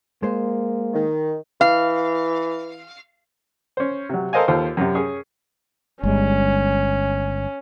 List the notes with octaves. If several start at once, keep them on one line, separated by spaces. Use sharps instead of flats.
G#3 A#3 C5
D#3
E3 F5
C#4 C5
C3 F#3
A4 A#4 C5 D#5 F5 G#5
D#2 F4 A4 C5 C6
F#2 C3
C#4 G#4
G1 G3 G#3 C#4